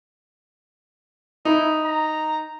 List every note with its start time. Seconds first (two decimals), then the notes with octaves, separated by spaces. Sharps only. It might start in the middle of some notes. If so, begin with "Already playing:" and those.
1.45 D#4 E4
1.85 A#5